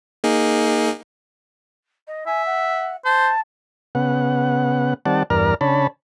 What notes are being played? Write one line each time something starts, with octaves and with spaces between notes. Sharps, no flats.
A#3 D#4 G#4
D#5
E5 G#5
F#5
C5 A5
C#3 B3 F#5
D#3 G3 C4 D5 F#5 A5
E2 G2 A#4 D5 A#5 F6
C#3 D4 C#5 A5 B5